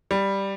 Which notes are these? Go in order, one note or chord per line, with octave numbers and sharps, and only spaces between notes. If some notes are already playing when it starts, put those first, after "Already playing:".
G3